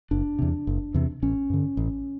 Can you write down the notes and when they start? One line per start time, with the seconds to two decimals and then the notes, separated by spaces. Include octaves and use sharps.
0.11 F#1 D4
0.39 E2 C3
0.67 F#1
0.94 E2 C3
1.22 A1 C#4
1.50 G2 D3
1.77 A1